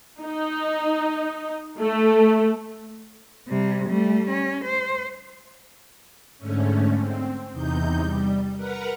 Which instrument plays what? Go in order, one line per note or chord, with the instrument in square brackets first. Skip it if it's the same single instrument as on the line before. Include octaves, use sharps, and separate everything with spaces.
[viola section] D#4
A3
[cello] C3 G3
G3 A3
C#4
C5
[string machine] G#2 D3 A3 C#4
C4
E2 C3 D#4 G6
G3
A#4 B4 F#5 A#5